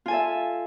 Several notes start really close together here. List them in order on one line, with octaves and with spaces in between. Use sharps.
F4 G#5 A4 E5